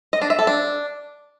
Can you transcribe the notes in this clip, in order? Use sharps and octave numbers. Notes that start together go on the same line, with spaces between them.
D#5
D4
E5
A4
D4